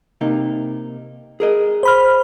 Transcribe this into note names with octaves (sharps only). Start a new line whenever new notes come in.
C3 A#3 D#4
G#4 A#4 D#5
C5 B5 F6